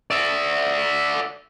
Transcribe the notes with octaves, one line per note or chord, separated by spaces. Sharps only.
D5 E5